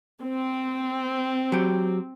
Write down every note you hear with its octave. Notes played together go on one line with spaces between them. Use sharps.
C4
F#3 G4